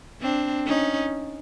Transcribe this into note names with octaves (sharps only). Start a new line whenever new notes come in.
C4 D4
C#4 D#4